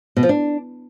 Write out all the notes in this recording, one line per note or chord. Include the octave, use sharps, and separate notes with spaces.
B2
F3
D4